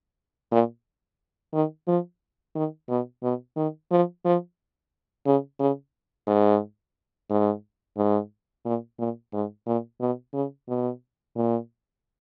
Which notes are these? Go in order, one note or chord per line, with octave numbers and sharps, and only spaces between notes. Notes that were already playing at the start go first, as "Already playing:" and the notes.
A#2
D#3
F3
D#3
B2
B2
D#3
F3
F3
C#3
C#3
G#2
G#2
G#2
A#2
A#2
G#2
A#2
B2
C#3
B2
A#2